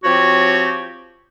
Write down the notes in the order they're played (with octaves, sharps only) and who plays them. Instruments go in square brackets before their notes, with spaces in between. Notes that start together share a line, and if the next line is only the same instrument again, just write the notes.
[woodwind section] F3 C4 F#4 G4 C#5